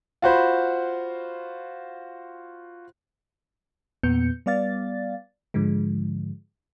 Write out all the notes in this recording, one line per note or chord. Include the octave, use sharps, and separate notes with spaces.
F4 F#4 C5 B5
E2 A#2 B3 G6 C#7
G3 B3 D5 F5 A6
G#2 D3 F3 G#3